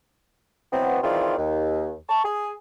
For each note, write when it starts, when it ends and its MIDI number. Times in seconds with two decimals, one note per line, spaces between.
0.72 0.99 47
0.72 0.99 52
0.72 0.99 54
0.72 0.99 59
0.72 0.99 60
1.03 1.35 51
1.03 1.35 52
1.03 1.35 60
1.03 1.35 65
1.03 1.35 68
1.03 1.35 74
1.38 1.92 39
2.09 2.24 81
2.09 2.24 85
2.24 2.52 68